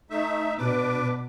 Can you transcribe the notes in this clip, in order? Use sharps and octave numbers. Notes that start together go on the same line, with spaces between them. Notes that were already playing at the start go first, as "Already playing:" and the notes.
A3 D#4 E5
B2 D4 B4 D6